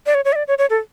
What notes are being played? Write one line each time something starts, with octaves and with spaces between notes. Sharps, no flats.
D5
C#5
C#5
E5
D5
C#5
C#5
A4